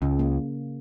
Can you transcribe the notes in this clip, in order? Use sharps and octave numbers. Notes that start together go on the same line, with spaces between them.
C#2 C#3
A#3